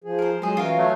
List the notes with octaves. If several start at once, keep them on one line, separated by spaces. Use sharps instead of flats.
F3 G#4
A#4 C5
F#3 G#3 G#4 C5
E3 C#4 F4 F#4 A#4 F5
F#3 A3